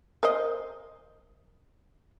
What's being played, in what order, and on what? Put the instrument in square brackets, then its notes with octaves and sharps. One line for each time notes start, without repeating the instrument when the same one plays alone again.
[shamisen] A#4 C5 D#5